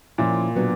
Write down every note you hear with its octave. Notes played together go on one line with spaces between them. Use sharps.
A#2 F3 A#3 C#4 E4
B2 F#3 B3 D4